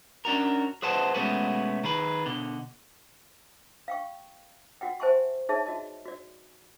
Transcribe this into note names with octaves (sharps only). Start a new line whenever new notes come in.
C#4 D4 F#4 A#4
G#4 B4 C5 F#5 A5
B2 G#3 A3 B3 C#4 F#4
D#3 G#4 B4
B2 D3
F5 G5 C#6
F#4 F#5 G5
C5 E5 G#5 A5 C6 C#6
D#4 G#4 C#5 E5 A5
F#4 D#5 A5
F#4 D5